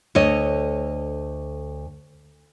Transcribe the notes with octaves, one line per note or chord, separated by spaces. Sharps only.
D2 A4 C#5 D#5